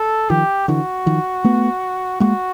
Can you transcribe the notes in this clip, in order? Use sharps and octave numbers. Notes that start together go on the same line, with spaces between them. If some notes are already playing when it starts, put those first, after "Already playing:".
Already playing: A4
D#3 F3 G4
D3 E3 F#4
D#3 F3
A3 B3
G#3 A#3 F#4